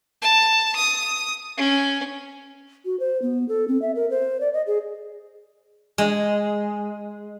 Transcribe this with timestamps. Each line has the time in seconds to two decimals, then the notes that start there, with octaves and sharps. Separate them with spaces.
0.22 A5
0.75 D#6
1.57 C#4
2.85 F#4
3.00 C5
3.22 B3
3.49 A4
3.68 C4
3.82 E5
3.95 A#4
4.10 C5
4.41 D5
4.53 D#5
4.67 G#4
5.98 G#3